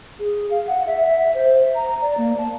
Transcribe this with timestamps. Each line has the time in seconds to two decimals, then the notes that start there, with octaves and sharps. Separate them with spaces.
0.19 G#4
0.50 F5
0.67 F#5
0.86 E5
1.07 E5
1.34 C5
1.75 A#5
2.02 D5
2.17 A#3
2.38 A5